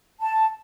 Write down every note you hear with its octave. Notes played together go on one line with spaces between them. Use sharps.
A5